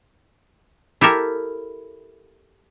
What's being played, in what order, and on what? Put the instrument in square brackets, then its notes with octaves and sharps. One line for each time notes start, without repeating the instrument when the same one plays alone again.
[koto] E4 G4 A4 A#4 E5